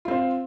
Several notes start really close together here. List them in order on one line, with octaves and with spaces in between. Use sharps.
F4 C4 C5